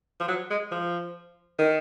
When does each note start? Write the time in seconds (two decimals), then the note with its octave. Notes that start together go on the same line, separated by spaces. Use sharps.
0.20 F3
0.28 F#3
0.50 G#3
0.72 F3
1.59 D#3